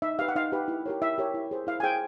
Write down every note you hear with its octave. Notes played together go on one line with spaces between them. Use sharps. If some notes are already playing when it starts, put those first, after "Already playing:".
D#4 E5
G4 B4 F5
F#5
D#4 F5
G4 B4
E4
G4 A#4 C#5
E4 E5
G4 A#4 C#5
E4
G#4 C5
E4 F5
G#5
G#4 C5 G5